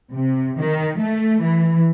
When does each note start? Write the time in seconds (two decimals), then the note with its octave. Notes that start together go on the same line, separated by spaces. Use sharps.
0.13 C3
0.59 D#3
1.00 A3
1.44 E3